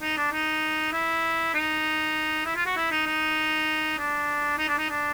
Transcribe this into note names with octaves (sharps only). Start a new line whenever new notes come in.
D#4
D4
D#4
E4
D#4
E4
F4
F#4
E4
D#4
D#4
D4
D#4
D4
D#4
D4